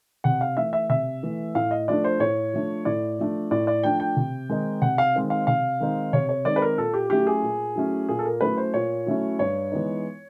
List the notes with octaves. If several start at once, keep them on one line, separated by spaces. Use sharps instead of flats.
C3 F#5
F5
E3 A3 E5
E5
C3 E5
E3 A3
A2 F5
D#5
F3 A3 D4 D5
C5
A2 C#5
F3 A3 D4
A2 D5
F3 A3 D4
A2 D5
D5
F3 A3 D4 G5
G5
C3
D#3 G#3 C4 D#4
C3 F#5
F5
D#3 G#3 C4 D#4
F5
C3 F5
D#3 G#3 C4 D#4
C3 C#5
C#5
D#3 G#3 C4 D#4 D5
B4
A#4
A#2 A4
G4
F#3 A3 C#4 E4 G4
G#4
A#2
F#3 A3 C#4 E4
A#2 G#4
A4
A#4
F#3 A3 C#4 E4 B4
C5
A#2 C#5
F#3 A3 C#4 E4
G2 C#5
E3 G#3 B3 D#4